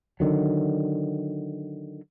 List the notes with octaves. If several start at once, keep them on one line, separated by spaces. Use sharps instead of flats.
D3 D#3 F#3